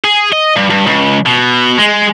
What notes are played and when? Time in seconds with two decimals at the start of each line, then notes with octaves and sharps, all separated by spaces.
0.05 G#4
0.32 D#5
0.56 G2
0.70 G2
0.86 C#2
1.26 B2
1.78 G#3